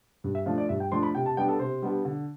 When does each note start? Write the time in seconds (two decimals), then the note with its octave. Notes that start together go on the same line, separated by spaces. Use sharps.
0.24 G2
0.35 E5
0.46 F3 A3 D4 F5
0.58 D5
0.69 G2 E5
0.80 G5
0.91 F3 A3 D4 C6
1.03 B5
1.15 C3 G5
1.26 A5
1.37 G3 B3 D4 G5
1.48 A4
1.59 C3 C5
1.82 G3 B3 D4
2.05 D3